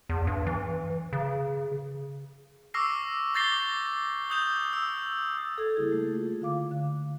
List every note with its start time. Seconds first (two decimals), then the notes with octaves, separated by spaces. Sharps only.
0.09 E2
0.27 G2
0.47 E3
1.13 C#3
2.74 C#6 D6 E6 F6 A#6 C7
3.34 D6 G6 A6 A#6 C7 G7
4.30 D#6 G6 F7
4.73 E6
5.58 A4 G#6 A6
5.77 C#3 G3 A#3 E4 G#4
5.92 A3
6.14 F4
6.41 D3 F4 F5 D6
6.71 D3 F5 F#6